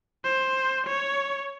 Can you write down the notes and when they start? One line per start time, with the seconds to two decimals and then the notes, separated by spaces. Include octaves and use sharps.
0.24 C5
0.87 C#5